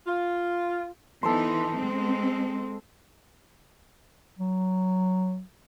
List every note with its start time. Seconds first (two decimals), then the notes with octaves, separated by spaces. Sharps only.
0.07 F4
1.23 E3 B3 D#4 A4 C5 C6
1.75 G#3 C4
4.39 F#3